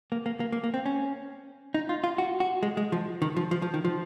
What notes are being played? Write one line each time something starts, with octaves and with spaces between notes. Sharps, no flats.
A#3
A#3
A#3
A#3
A#3
C4
C#4
D#4
F4
F4
F#4
F#4
G#3
G#3
F3
D#3
F3
F3
F3
D#3
F3